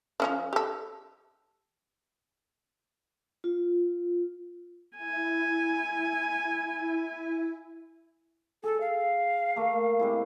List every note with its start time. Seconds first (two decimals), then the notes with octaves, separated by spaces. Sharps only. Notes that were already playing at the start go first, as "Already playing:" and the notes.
0.20 F3 C#4 D4
0.53 G4 A4
3.44 F4
4.97 E4 G#5
8.64 G#4 A4
8.81 F5
9.56 A3 A#3
9.99 C3 G#3 E4